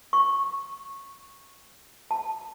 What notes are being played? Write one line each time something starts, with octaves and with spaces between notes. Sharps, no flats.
C#6
A5